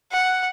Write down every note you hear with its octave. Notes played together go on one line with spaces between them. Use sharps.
F#5